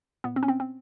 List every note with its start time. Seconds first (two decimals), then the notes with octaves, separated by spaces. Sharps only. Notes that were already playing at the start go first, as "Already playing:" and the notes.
0.24 A#2 B3
0.36 C4
0.43 C#4
0.48 C4
0.60 C4